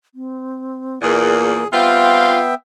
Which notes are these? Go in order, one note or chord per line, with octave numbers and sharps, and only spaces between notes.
C4
E2 A#2 A#3 G#4
G3 B3 C4 F4 E5 F5 G5